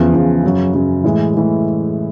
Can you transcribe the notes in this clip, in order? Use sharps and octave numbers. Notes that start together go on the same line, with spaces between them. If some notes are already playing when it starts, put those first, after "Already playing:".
Already playing: E2 C#3 F3
E2 C#3 F3
F#2 C#3 F#3
F#2 C#3 F#3
A2 E3 G#3
A2 E3 G#3